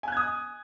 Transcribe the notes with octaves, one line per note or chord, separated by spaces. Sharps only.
G#5 D#6 F#6 G#6